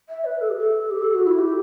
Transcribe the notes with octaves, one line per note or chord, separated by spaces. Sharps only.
E5
B4
A4
G4
A4
G4
A4
F#4
E4
G4